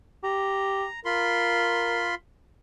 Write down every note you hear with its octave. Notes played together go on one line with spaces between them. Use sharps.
G4 A#5
F4 A#4 B5 C6